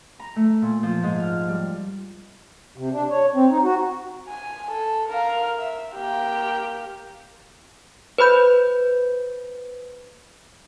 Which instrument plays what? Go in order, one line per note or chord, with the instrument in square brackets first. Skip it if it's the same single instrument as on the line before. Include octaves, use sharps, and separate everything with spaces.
[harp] A#5
A3
A#2
F3
G#2
F6
G3
[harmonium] C3
D4
C#5
C4
D#4
F#4
[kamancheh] G#5
A4
A#4 F5
E5
A#3 G4
[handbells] B4 C5 B5 G6